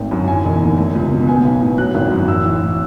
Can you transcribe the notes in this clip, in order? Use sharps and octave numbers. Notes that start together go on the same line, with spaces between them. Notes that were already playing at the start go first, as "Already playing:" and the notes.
Already playing: G#1 A3
F#2
E3 G#5
E1
D#2
A3
C#2
B2
B3 G#5
B1
A2
F#3 F#6
G#1
F#2
A1 E6
A1
A2